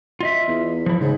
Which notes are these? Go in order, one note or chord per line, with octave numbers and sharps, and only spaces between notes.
F4 D#5 E5
E2
F3 E4
G#2 C#3